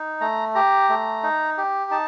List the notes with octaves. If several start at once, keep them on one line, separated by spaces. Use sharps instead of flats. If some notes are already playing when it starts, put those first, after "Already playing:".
Already playing: D#4
A3 A#5
G4 A#5
A3
D#4
G4
D#4 A5